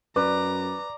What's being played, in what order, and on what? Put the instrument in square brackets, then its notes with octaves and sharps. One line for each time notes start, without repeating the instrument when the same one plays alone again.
[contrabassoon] F#2 [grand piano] B4 [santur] D5 [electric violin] A#5